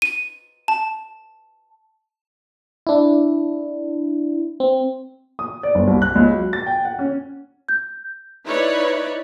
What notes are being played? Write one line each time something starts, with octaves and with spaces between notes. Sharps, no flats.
D#7
A5
D4 E4
C4
D#6
D5
G1
C2
F#6
C#2
F#3
A6
G5
F#5
C#4
G6
D#4 E4 B4 C#5 D5 B5